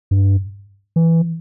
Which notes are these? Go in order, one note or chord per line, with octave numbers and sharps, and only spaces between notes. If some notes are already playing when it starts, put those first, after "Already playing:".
G2
E3